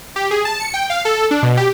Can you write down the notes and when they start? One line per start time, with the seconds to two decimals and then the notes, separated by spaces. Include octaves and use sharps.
0.16 G4
0.31 G#4
0.45 A5
0.60 C#7
0.74 G5
0.90 F5
1.05 A4
1.31 D4
1.43 B2
1.57 G4